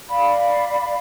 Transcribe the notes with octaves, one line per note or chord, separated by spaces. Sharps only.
D5 F5 B5